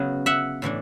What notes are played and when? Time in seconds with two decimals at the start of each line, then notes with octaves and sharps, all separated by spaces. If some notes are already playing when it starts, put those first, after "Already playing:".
Already playing: C#3 F#3 B3
0.26 E5 F#5
0.62 A2 E3 A3 D4